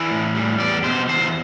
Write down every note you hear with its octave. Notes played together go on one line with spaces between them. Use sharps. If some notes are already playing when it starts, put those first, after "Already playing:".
Already playing: E3 D5
A2
G3
E2 D5
B2 C5
E2 C5